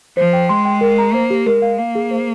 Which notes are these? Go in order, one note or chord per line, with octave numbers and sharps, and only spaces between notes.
F3 C5
G5
G#3 C6
G5
A#4
A#5
A#3 C5
G4
G#3 A#4
F5
A#3 F5
G#4
C5